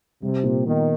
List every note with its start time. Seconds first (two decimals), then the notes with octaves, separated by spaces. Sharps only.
0.22 C3 G3
0.44 A#2
0.66 D#3 B3